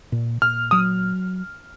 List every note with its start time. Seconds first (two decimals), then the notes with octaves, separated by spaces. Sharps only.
0.12 A#2
0.42 A#2 F6
0.71 F#3 D#6